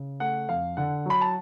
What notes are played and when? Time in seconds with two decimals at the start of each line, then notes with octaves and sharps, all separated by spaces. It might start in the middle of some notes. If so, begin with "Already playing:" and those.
Already playing: C#3
0.20 A3 F#5
0.49 F2 F5
0.77 D3 F#5
1.06 F#3 B5
1.21 A5